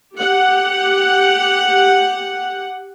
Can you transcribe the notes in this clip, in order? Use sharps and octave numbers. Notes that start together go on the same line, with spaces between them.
G4 F#5